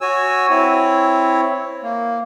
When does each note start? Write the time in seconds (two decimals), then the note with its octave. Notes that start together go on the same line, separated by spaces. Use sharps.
0.01 F#4 C#5 G#5 E6
0.50 C4 E4 C#5
1.83 A#3